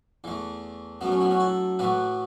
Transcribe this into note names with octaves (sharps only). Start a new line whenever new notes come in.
E2 E3 A3
F#2 F#3 A3 B3
C#4
B3 E4
C#4 F#4
E4 A4
A2 E3 A3 F#4 B4